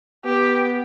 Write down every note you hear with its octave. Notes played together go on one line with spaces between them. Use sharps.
B3 G4